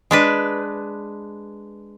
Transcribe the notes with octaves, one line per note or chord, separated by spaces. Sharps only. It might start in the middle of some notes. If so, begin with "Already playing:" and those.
G#3 D4 B4